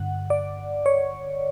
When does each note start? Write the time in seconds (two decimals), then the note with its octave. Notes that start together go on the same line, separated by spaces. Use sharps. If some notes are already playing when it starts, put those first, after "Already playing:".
Already playing: G2 D3 F#5
0.30 D5
0.86 C#5